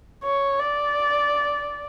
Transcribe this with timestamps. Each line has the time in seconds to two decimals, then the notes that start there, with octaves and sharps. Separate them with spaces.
0.24 C#5
0.60 D5